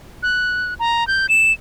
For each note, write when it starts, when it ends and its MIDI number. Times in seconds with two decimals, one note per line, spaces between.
0.23 0.74 90
0.79 1.07 82
1.07 1.27 91
1.29 1.52 100